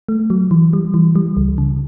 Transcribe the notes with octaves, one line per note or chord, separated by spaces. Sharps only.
A3
F#3
E3
G3
E3
G3
C#2
C#3